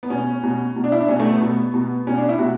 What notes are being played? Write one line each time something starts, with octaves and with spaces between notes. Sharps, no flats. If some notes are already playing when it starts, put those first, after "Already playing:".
B3
B2 C#4
B2
B2
D4
E4
D4
B2 C#4
A3
B3
B2
B2
B2 C#4
D4
E4
B2 F#4